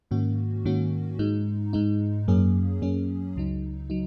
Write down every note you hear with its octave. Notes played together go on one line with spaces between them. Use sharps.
G#2 D#3 A#3 C#4 F#4
G#2 D#3 A#3 C#4 F#4
G#2 G#3 D#4
G#2 G#3 D#4
F#2 F#3 A#3 C#4 G#4
F#2 F#3 A#3 C#4 G#4
C#2 C#3 F#3 D#4
F#3 D#4